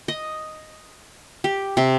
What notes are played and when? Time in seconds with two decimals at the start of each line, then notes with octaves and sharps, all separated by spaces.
0.08 D#5
1.44 G4
1.77 C3